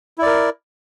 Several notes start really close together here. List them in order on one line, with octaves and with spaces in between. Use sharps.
E4 D5 A#4